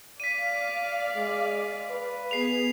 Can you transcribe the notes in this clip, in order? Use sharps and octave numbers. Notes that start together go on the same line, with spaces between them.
D5 F5 B6 D#7
G#3
B4
B3 G#4 C7 F7